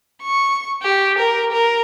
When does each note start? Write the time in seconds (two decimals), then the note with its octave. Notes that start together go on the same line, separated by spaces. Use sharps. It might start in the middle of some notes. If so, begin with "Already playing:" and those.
0.22 C#6
0.83 G4
1.18 A#4
1.52 A#4